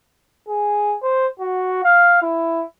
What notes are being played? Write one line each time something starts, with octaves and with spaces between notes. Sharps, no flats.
G#4
C5
F#4
F5
E4